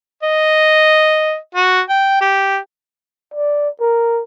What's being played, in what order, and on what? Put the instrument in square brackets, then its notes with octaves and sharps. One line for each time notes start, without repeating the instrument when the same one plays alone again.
[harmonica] D#5
F#4
G5
G4
[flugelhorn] D5
A#4